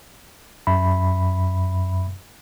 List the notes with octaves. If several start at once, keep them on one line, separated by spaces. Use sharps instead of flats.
F#2 E5 B5